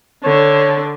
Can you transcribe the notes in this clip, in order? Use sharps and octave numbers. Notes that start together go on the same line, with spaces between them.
D3 C#5